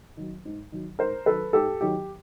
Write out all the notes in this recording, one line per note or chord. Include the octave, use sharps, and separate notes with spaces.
D#3 F#3
G#2
D#3 F#3
G#2 A#4 C5
D#3 F#3 A4 B4
G#2 G4 A4
D#3 F#3 G4